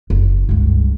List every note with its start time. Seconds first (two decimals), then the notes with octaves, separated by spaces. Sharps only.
0.10 F#1
0.49 C#2 G2